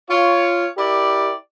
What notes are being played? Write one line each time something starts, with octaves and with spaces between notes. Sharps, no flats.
F4 C#5
E4 G4 A#4 D5